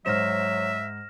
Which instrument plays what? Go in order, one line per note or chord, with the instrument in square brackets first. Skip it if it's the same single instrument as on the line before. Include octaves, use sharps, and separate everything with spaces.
[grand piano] G#2 C5 [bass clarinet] F#3 [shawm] E5 [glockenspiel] F6 A#6 E7